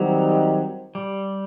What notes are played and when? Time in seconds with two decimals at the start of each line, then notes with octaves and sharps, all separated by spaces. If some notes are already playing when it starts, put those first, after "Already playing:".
Already playing: D#3 F#3 G3 C4 D#4 G4
0.95 G3